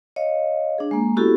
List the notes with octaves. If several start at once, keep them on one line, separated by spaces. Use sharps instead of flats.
C#5 D#5 F5
D4 G#4
G#3 A#3
B3 C#4 E4 F#4 G4 A4